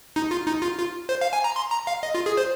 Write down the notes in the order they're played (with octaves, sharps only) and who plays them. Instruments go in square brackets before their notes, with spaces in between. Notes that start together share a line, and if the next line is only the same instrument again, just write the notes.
[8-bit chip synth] D#4
F4
D#4
F4
F4
C5
F5
G#5
A#5
C6
A#5
F5
D#5
F4
G#4
C5